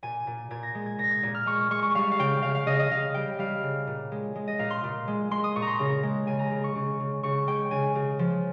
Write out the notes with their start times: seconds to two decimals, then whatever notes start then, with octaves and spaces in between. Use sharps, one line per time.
0.03 A#2 G#5
0.27 A#2
0.51 A#2 G#6
0.63 A#6
0.75 G#3
0.86 G#6
0.99 A#2 A#6
1.11 G#6
1.23 A#2
1.35 F6
1.46 G#3 C#6
1.71 G#3 C#6
1.83 C#6
1.95 G3 F5
2.11 F5
2.19 C#3 G5
2.42 C#3 F5
2.55 F5
2.66 C#3 D#5
2.79 D#5
2.90 C#3 F5
3.14 G3 G5
3.39 G3 F5
3.63 C#3
3.87 A#2
4.12 G#3
4.35 G#3
4.47 D#5
4.59 A#2 F5
4.70 C6
4.84 A#2
5.08 G#3
5.31 G#3 C6
5.44 D#6
5.56 A#2 C#6
5.62 A#5 C6
5.79 C#3 A#5
6.03 G#3
6.27 C#3 G#5
6.39 A#5
6.51 C#3
6.64 C#6
6.75 C#3
7.00 C#3
7.23 C#3 C#6
7.47 G#3 G5
7.71 C#3 G#5
7.95 C#3
8.19 F3